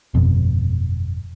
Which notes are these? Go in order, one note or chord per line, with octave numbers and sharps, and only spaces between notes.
G1 F2 B2